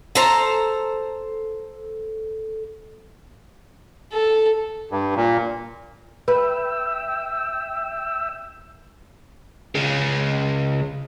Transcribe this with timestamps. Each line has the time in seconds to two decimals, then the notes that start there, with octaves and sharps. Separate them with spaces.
0.15 A4 C5 A#5
4.13 A4
4.91 G2
5.16 A#2
6.28 B4 E5 G5 E6
9.75 C#3 G#3